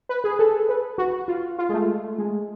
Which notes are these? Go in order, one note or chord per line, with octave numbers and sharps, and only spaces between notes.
B4
G#4
A4
B4
F#4
F4
F4
G#3
A3
G#3